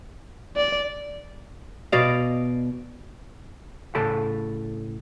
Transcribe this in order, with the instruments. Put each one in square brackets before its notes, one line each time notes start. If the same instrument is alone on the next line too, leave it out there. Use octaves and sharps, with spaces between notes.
[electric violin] D5
[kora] B2 D5 D#5 F5
[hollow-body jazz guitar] A2 C#3 A4 A5 B5